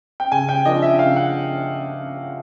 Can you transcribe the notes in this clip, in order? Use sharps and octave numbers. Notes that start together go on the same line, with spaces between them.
G5
C#3 G#5
G5
F3 A#3 D4 D#5
E5
C#3 F5
F#5